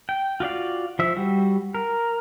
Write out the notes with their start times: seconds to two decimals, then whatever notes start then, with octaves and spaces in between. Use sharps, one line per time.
0.09 G5
0.40 F4 F#4 D5 F5
0.99 F3 E5
1.17 G3 F#4
1.75 A#4